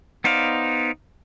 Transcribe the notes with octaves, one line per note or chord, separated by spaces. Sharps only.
B3 D#4 C5 D5 F5